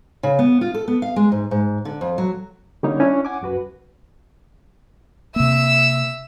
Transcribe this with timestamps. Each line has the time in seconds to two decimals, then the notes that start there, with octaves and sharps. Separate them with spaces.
0.23 C#3
0.39 B3
0.61 F4
0.74 A4
0.88 B3
1.02 F5
1.16 G#3
1.32 G#2
1.51 G#2
1.85 D3
2.01 F2
2.18 F#3
2.83 D3 G3 A#3 C#4 D#4 C#5
3.00 C#4 D4 E4
3.25 F#5 G#5 D6
3.41 C2 F#2 F#4 B4
5.36 C3 A#3 E5 E6